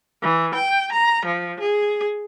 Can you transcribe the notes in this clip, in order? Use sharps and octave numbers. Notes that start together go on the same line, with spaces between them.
E3
G5
A#5
F3
G#4